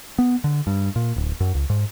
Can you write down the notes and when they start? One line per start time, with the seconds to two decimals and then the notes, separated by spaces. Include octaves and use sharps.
0.19 B3
0.44 D3
0.67 G2
0.96 A#2
1.16 D1
1.40 F#2
1.55 C#2
1.70 G#2